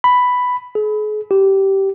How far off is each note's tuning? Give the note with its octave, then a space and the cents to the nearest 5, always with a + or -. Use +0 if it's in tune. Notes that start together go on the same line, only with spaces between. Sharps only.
B5 +5
G#4 +40
G4 -15